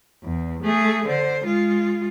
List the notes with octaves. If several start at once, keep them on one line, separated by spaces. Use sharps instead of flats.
E2
A3 G#4
D3 C5
G#3 F4